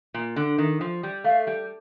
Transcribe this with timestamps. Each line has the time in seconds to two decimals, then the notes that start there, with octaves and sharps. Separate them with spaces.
0.14 A#2
0.36 D3
0.58 D#3
0.81 F3
1.03 G3
1.24 A3 F5
1.47 G3